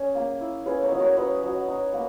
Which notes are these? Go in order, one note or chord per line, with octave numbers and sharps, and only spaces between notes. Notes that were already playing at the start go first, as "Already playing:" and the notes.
Already playing: C#4 G#4
A#3
E4
C#4 G#4 B4
A#4 C#5
F#3 D#5
A#4 C#5
C#4 B4 D#5
F#3
D#4
A#3